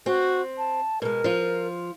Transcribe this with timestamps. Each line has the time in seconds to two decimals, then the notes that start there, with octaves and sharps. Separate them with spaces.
0.06 C4 F#4
0.58 A5
1.02 B2 G#3 A#4
1.24 F3 F4